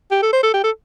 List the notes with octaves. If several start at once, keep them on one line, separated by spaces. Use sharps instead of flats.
G4
A4
C5
A4
G4
A4